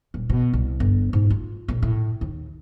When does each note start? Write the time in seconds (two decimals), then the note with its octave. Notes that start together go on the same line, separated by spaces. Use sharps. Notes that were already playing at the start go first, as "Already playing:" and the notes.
0.14 D#1
0.30 B2
0.53 C2
0.80 G1
1.13 G#2
1.30 F4
1.68 A#1
1.83 A2
2.21 D#2